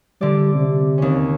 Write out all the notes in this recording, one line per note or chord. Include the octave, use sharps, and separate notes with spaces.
D3 G3 D5
C3
D#2 C#4